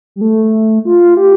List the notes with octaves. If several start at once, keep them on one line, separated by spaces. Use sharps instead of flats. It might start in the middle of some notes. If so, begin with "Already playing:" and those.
G3
A3
F4
G4